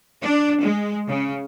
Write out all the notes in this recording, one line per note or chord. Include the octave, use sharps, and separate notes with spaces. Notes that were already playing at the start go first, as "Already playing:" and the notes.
D4
G#3
C#3